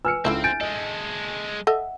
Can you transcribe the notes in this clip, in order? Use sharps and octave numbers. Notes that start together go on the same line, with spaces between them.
B4 G#5 E6 F6 C#7
C#2 D3 C4 E4 E5
G#5 G6 A6 D7
G#3 A4 D#5
A4 D#5 E5 F#5